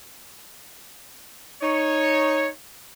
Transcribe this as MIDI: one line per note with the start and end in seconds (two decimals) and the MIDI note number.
1.62 2.48 63
1.62 2.48 73